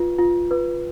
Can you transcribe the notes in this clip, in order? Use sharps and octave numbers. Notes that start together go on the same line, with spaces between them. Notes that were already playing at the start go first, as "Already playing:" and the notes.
Already playing: F4 B4
F4
B4